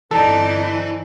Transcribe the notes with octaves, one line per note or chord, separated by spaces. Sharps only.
G1 E3 C4 D#4 A4 D5 A5